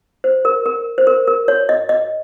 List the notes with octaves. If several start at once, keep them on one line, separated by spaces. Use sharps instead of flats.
C5
A#4
A#4
C5
A#4
A#4
C#5
D#5
D#5